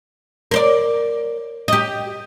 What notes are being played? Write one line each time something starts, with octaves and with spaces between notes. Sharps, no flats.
A#4 C5 D5
G4 D#5